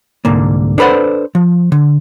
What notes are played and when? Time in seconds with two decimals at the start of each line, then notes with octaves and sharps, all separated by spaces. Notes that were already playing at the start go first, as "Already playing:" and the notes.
0.25 C2 G#2 D3 A#3
0.78 D4 A4 B4 C5 F#5
1.35 F3
1.72 D3